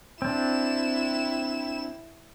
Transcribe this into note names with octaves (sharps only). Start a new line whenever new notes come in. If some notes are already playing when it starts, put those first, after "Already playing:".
C4 D4 E4 E7